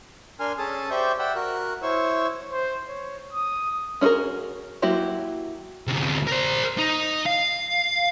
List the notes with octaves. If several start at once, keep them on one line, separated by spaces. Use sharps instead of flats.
D4 A#4 G#5 C6 F6
C#4 G#4 A4 A5 D#6
G4 C5 D5 E5 C#6 G6
D5 E5 F#5 G5 B5 E6
F#4 A#4 F#6
E4 C5 C#5 C#6 E6
C5
C#5
D#6
C#4 D4 F#4 G#4 A#4
F#3 A#3 E4 F#4 G4
D2 C3
A#4 C5
D#4
F5